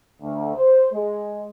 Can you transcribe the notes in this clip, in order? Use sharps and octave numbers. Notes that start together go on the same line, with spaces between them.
D2
C5
G#3